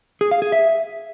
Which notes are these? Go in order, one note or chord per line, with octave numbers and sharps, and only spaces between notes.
G#4
F5
G#4
E5